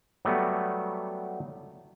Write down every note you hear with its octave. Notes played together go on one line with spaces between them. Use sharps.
F#3 G3 A3 B3